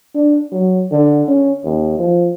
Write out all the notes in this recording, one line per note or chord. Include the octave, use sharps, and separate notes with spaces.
D4
F#3
D3
C#4
D#2
F3